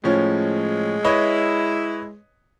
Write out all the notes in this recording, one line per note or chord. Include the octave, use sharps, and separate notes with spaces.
A2 F3 G#3 C#4
E4 B4 C#5 D#5